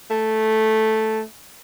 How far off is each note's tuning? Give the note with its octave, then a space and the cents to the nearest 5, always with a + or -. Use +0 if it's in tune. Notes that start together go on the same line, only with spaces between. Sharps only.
A3 -5